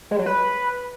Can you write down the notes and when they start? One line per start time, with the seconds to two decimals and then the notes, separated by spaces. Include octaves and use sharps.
0.11 G#3
0.19 F#3
0.26 B4